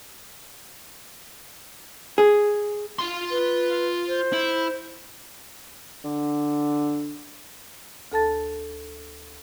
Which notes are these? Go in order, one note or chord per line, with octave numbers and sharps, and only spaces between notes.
G#4
F4 C6
B4
C5
E4
D3
D2 A4 A5 A6